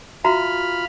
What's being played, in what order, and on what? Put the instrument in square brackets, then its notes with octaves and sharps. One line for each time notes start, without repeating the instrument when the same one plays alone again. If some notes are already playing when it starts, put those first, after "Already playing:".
[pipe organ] F4 B5 F6 [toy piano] F#4 E5 A#5